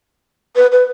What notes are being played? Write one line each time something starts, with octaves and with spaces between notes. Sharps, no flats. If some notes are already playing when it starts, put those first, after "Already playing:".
B4
B4